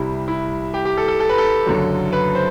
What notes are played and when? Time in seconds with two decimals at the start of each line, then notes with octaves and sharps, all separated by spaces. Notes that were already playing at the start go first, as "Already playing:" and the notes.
Already playing: C2 C3 G3 E4
0.28 E4
0.74 G4
0.85 G4
0.97 A4
1.08 A4
1.20 A4
1.29 B4
1.38 A4
1.66 F#1 F#2 D3 F#3
2.13 B4
2.35 C5